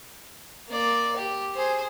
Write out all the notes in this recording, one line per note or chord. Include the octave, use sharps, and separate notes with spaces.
A#3 D5
G4
G#4 C5